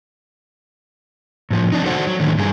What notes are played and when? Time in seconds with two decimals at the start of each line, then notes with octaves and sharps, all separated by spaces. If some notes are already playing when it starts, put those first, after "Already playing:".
1.51 A2 F3
1.72 C4 D4 D#4
1.85 F#4 A4 C5 D5 F#5
2.07 F#3
2.20 A2 D3 D#3
2.38 G2 G#4